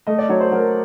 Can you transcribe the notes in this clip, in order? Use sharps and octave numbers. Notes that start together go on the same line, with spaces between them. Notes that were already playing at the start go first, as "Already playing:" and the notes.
A3 D#5
D5
F#3 C#5
C5
F#3 A#4